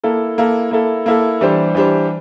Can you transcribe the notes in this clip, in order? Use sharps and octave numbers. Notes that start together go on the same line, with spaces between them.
A#3 E4 A4
A#3 E4 A4
A#3 E4 A4
A#3 E4 A4
E3 G3 D4 G4 C5
E3 G3 D4 G4 C5